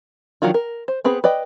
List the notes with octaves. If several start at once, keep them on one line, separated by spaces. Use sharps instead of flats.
D#3 F#3 D4 F4 F#4
A#4
C5
B3 C4 G#4 B4
B4 D5 D#5 G5